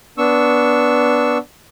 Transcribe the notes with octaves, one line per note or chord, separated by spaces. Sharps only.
B3 D4 C#6 E6